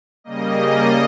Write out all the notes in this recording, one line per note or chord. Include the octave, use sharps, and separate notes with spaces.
C#3 G3 A#3 D#5